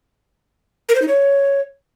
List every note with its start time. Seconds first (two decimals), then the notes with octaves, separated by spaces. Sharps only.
0.89 A#4
0.95 C5
1.02 D#4
1.08 C#5